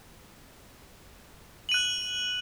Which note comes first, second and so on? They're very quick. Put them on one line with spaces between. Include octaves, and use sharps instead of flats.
F#7 D#7 F#6